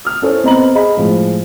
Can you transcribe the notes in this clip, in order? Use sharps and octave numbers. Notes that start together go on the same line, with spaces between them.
D#6 F6
C#4 E4 A4 C5 C#5
B3 C4 D#5 A#5 B5 F#7
G#4 D#5 B5
A2 F3 G#3